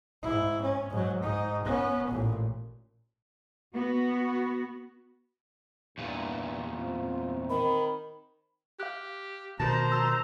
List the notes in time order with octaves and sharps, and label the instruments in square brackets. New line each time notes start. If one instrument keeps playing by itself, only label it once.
[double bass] G#2 E4
C#4
G#2 F#3
G#2 D#4
B3 C#4
A1 A#2
[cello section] B3 F#4
[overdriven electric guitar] E2 A#2 [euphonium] G2
[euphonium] C4 [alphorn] F4
[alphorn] D#3 [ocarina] B5
[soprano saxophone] G4 [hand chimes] F5 D6 F#6
[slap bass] B2 D#3 [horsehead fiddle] C5 A#5 [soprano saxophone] A5 [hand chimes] A#6
[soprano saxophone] A5 [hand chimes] E6